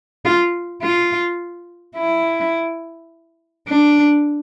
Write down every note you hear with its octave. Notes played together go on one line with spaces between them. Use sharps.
F4
F4
E4
D4